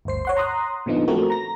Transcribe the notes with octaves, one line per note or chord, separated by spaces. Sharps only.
G1 D2 C5 C7
C#5 F#5 C6
A#5 C6 D#6 F#6
A#2 D3 F3 B3 D#4
F3 A3 C4 F#4 A#4
A#5 A#6